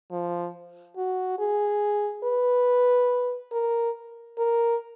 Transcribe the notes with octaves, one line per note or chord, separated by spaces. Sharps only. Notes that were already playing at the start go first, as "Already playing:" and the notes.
F3
F#4
G#4
B4
A#4
A#4